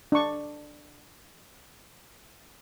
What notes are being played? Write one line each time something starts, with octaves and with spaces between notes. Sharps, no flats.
D4 C#6